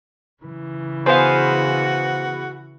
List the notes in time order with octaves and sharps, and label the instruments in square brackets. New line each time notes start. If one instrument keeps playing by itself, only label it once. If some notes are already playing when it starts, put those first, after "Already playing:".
[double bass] C#3 E3
[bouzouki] B3 G#4 [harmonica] F#4 [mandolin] C5 F5